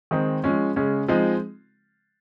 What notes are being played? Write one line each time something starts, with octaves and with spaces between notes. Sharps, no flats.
D#3 G#3 C4 D#4
F3 G#3 C#4
C#3 G#3 C#4
F3 G#3 C4 D#4